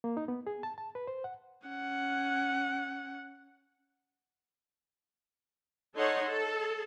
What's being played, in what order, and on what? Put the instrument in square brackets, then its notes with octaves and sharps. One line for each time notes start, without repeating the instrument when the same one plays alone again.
[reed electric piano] A#3
D#4
B3
G#4
A5
A5
B4
C5
F#5
[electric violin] C#4 F#5
[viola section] D#4 A4 C#5 F#5 C6
A4